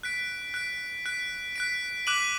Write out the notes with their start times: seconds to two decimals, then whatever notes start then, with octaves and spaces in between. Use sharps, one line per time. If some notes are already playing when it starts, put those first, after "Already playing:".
0.03 F#6 B6 D7
0.54 F#6 B6 D7
1.06 F#6 B6 D7
1.56 F#6 B6 D7
2.07 D6 F#6 B6 D#7 F#7